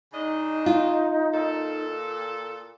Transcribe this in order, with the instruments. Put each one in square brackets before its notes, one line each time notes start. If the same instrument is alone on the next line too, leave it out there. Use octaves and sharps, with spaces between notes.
[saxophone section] C#3 D4 D#5 [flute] D#4
[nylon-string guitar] F4
[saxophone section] A#2 A4